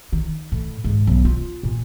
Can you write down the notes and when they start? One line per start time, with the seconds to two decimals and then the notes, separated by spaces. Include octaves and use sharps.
0.12 D#3
0.52 A2
0.84 G#2
1.07 B1
1.25 F4
1.63 A#2